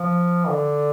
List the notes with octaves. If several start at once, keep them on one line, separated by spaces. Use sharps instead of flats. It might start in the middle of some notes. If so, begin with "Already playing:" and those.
Already playing: F3
D3